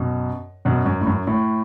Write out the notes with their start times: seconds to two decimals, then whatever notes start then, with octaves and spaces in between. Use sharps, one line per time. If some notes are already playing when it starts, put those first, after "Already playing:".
Already playing: F#2 B2
0.65 F#2 B2
0.86 F#2
1.01 A2
1.07 F#2
1.27 A2